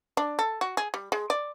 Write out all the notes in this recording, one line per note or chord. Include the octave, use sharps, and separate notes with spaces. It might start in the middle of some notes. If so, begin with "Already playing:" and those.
D4
A4
F#4
G#4
G3
G#3
D5